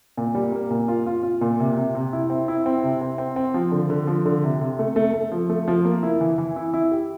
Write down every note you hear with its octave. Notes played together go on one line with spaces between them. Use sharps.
A#2
G3
A#3
A#2
F4
F4
F4
A#2
C3
C3
C3
E4
C4
E4
C4
C3
C4
C4
C4
F3
D3
D3
F3
D3
C3
C3
A3
A3
A3
F3
A3
F3
A#3
E4
E3
E3
E4
E4
G4